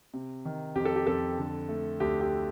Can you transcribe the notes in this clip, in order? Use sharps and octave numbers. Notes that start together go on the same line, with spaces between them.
C3
D#3
F2 G4
A4
G4
F2 A4
D3
A3
D2 G4
G4